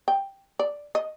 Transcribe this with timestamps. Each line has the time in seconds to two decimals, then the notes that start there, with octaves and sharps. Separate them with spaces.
0.08 G5
0.59 D5
0.95 D#5